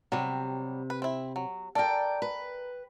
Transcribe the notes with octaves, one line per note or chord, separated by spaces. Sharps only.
C3 F#3 G3
B4
C4 E4
F#3
A4 A#4 D5 G5
B4